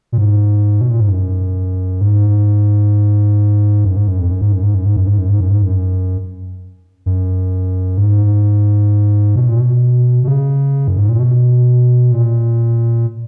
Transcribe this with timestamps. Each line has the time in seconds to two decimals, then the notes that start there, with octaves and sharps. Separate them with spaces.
0.12 A#2
0.18 G#2
0.81 B2
0.90 A#2
1.00 G#2
1.09 F#2
2.01 G#2
3.85 F#2
3.97 G#2
4.08 F#2
4.19 F2
4.31 F#2
4.41 G#2
4.52 F#2
4.63 G#2
4.74 F#2
4.86 G#2
4.96 F#2
5.07 G#2
5.18 F#2
5.30 G#2
5.41 F#2
5.51 G#2
5.62 F#2
7.06 F#2
7.98 G#2
9.36 B2
9.48 A#2
9.60 B2
10.23 B2
10.28 C#3
10.88 F#2
10.98 G#2
11.09 A#2
11.20 B2
12.11 A#2